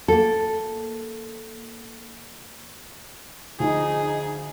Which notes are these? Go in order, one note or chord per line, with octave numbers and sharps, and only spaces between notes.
A#3 A4
D2 F3 D#4 G#4